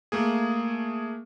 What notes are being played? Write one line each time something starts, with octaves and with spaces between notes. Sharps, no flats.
A3 A#3 G#4